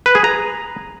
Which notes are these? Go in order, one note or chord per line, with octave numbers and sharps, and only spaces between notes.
B4
G#4
A#5